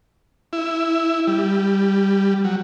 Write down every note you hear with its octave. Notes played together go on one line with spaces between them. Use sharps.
E4
G3
F#3